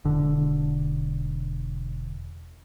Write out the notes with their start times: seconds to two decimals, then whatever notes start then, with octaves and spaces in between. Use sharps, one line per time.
0.05 E1 D3